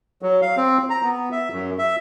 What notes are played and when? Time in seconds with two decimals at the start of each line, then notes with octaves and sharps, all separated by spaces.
0.22 F#3
0.42 F5
0.57 C4
0.90 A#5
1.03 B3
1.32 E5
1.52 F#2
1.79 E5